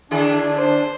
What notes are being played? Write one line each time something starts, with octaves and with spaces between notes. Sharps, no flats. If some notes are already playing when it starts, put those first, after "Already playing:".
D3 D4 E4 G#4
C5